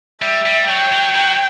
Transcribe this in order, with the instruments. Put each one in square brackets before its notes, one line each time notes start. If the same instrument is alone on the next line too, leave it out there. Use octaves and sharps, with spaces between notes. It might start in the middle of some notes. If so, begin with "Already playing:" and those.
[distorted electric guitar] G3 [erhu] E5
[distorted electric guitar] G3
[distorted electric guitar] F#3 [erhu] G5
[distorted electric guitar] F#3
F#3